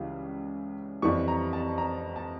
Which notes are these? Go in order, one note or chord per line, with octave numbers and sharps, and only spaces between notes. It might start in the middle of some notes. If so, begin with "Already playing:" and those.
Already playing: C#2 C#3 E3 G3
F2 E3 G3 C#6
A#5
A5
A#5
A5